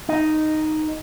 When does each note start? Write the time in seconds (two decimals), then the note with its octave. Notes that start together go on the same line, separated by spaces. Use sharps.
0.09 D#4